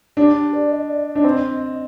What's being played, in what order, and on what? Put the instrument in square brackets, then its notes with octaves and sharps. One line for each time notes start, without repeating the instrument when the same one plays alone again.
[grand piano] D4 [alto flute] G4
[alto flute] G4
D5
D#5
D5
D#5
[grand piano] D4
C4